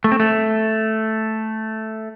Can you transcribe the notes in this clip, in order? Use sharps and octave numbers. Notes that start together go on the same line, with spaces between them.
A3
C4
A3